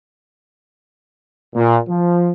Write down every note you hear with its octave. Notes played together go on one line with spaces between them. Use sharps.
A#2
F3